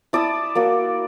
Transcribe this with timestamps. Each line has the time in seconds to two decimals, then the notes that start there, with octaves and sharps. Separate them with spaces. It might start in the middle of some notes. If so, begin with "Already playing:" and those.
0.13 E4 D5 A5 D#6
0.55 A#3 F#4 D5